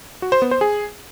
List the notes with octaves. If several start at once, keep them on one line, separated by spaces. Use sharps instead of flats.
F#4
C5
B3
C5
G#4